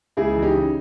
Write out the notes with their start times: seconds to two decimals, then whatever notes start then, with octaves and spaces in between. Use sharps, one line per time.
0.17 C#2 E4 G#4
0.36 E3
0.42 D#4 G4
0.55 C#3